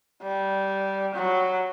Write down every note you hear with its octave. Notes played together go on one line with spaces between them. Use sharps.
G3
F#3